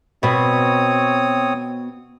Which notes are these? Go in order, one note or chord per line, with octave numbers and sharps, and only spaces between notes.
B2 B3 C4 C#5 D#6